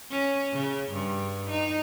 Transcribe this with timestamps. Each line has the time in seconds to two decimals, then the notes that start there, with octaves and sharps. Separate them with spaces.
0.11 C#4
0.53 C#3
0.92 G2
1.50 D#4